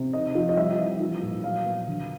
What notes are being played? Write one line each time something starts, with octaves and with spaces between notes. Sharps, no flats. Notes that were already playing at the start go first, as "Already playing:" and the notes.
Already playing: C3
D#4 D#5
F3
D#5
G3 E5
E3
F3
A#2
F#3 F5
B3
D3